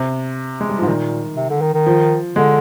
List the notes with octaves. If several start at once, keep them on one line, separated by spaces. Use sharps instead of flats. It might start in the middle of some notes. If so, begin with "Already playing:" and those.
Already playing: C3
G#3
G3
G#2 F3
A#2 D#3
C3
D3
D#3
D#3
F3
D3 G#3